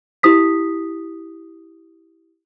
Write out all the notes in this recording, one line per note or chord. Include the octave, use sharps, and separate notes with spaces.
E4 G4 D#6 B6